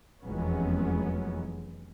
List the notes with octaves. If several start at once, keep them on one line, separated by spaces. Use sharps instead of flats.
F1 E2 F#3 G#3 B3 C#4